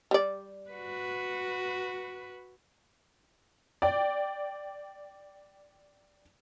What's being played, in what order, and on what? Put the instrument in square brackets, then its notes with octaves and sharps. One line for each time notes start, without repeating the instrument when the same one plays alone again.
[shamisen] G3 D5
[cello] F#4 B4
[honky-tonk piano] D5 G5